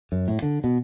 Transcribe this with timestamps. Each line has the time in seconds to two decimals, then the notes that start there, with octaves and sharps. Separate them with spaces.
0.12 F#2
0.28 A2
0.42 D3
0.64 B2